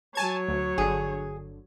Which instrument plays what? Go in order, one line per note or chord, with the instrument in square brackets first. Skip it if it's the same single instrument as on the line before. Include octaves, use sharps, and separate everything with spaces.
[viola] F#3 C#5 [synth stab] G#5 A5 G#6
[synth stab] D2
[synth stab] G1 D3 [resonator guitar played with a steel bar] G#4